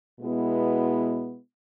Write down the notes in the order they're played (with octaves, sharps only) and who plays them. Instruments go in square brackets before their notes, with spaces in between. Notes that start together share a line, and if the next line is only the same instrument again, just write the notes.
[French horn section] B2 G#3 B3 E4